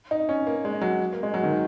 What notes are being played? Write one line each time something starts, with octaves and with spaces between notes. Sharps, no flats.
D#4
C#4
A#3
G#3
F#3
A#3
G#3
F#3
D#3